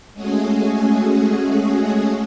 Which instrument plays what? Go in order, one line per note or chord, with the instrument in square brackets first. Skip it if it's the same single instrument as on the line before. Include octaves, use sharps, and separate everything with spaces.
[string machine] G#3 A3 C#4 F#4 G#4